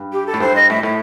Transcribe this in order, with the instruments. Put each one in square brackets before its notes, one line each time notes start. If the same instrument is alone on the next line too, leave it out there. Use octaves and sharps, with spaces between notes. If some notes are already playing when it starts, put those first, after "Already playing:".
Already playing: [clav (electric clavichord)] G2
[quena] G4
A4
[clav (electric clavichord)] A2
[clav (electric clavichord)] G2 [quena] C5
[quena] D#5
[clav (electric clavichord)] A2 [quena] E5
[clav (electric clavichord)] A2 [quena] E5